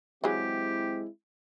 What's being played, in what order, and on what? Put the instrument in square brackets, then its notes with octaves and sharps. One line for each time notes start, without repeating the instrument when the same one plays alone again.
[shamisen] E3 F#3 G#4 [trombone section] G#3 C4 E4 [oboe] G4